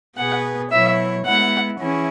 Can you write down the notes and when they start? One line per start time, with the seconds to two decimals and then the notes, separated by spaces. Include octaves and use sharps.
0.17 B2 B3 G#4 B4 F#5
0.71 B2 F#3 E4 C#5 E5
1.25 G#3 B3 E4 F#5
1.80 E3 C#4 E4 G#4